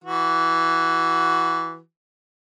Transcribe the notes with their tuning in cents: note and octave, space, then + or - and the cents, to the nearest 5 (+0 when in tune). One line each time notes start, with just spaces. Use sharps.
E3 +0 F#4 +0